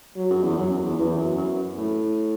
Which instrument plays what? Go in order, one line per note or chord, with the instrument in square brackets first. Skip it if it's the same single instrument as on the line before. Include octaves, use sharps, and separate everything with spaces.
[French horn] F#3
[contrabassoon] F#2
E2
[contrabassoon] F#2 [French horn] F#3
[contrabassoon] F#2
E2
[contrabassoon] E2 [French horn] E3
[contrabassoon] F#2
F#2
A2